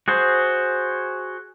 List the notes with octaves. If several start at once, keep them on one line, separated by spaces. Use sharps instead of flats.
F#4 G#4 C5